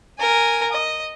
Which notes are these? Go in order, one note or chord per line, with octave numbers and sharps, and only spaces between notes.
A#4 G#5
D#5